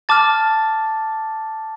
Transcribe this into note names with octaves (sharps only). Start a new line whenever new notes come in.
A5 D6 F6 A6